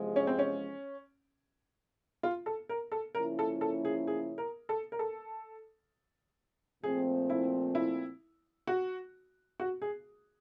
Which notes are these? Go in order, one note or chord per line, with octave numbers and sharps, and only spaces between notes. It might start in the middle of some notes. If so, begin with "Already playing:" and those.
Already playing: E2 C3 F3 G#3
C#4
C4
C#4
F4
A4
A#4
A4
C#3 F3 A#3 C#4 E4 A#4
A4
A4
G#4
G#4
A#4
A4
A#4
A4
A#2 F3 A3 C4 G#4
E4
E4
F#4
F#4
G#4